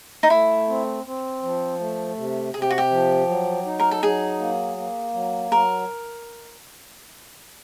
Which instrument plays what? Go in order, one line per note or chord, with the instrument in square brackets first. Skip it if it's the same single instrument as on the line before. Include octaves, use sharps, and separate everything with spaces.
[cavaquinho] D#4
[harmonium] A3 [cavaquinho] E4
[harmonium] C4
C4
F3
A3
C3
[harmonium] C3 [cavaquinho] G#4
[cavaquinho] G4
F#4
G4
[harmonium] F3
F#3
D#4
[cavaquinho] A#4
A4
[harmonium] F#3 [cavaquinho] G#4
[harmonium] A#3
A#3
F#3
[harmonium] F#3 [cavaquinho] A#4